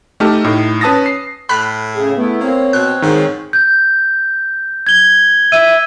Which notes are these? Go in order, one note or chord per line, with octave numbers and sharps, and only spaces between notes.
A3 D#4 G4 A5 F6
A2 D#4
C#4 B4 A5 D#6 A6 A#6
C7
A2 B5 F#6 B6
C#3 G#4
A3 B3 E4
A#3 C4 C#5
B2 F#6
G#2 D#3
G6
G#6 G7
E5 E6 D#7